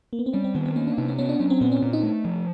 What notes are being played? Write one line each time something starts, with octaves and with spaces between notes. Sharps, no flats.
A#3
B3
C4
G3 C#4
C4
D#3 B3
C4
A#3 C#4
D4
C3 D#4
C#4
B3 C#4
D4
F#3 C#4
C4
A#2 B3
C#4
A#2
D#4
A3
F3